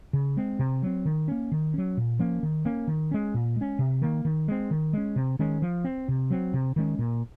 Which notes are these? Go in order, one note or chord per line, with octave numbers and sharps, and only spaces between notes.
C#3
G#3 C4
C3
F#3 C4
D#3
A#3 C#4
D#3
F#3 C#4
A#2
F3 A#3 C#4
D#3
A#3 C#4
D#3
G#3 C#4
A#2
G#3 C#4
C3
D#3 A#3
D#3
G#3 C4
D#3
G#3 C#4
C3
D#3 G#3 C#4
F3
C4
C3
F#3 C4
C3
D#3 G#3 C#4
A#2